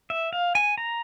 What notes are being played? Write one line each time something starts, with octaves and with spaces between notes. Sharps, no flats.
E5
F5
G#5
A#5